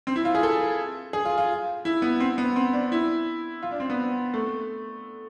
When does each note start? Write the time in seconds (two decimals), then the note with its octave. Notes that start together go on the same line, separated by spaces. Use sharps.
0.07 C4
0.16 E4
0.25 F4
0.35 G#4
0.43 A4
1.13 G#4
1.25 F4
1.38 F4
1.85 E4
2.02 B3
2.20 C4
2.38 B3
2.56 C4
2.73 D4
2.92 E4
3.63 F4
3.71 D4
3.80 C4
3.90 B3
4.34 A3